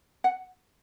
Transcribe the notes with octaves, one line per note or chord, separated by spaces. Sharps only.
F#5